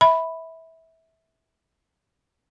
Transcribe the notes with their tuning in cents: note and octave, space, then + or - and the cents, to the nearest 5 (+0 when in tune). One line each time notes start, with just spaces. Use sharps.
E5 -20 B5 +0